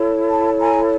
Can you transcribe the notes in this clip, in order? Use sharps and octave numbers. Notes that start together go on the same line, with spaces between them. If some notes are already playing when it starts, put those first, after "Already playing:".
Already playing: E4 A4 C#5
A5 B5
G#5 A#5